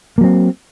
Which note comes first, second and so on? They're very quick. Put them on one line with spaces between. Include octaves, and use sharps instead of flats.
A#3 F#3 C4